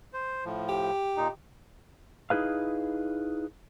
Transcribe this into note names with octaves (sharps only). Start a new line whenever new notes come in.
C5
A2 F3
G4
A#2 D#4
D#4 E4 G#4 B4 F5